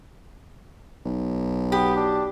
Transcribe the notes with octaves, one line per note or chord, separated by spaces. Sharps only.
B1
B3 G4
D4